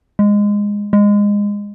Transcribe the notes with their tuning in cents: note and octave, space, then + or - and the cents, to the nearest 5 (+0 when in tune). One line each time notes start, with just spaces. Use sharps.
G#3 -15
G#3 -20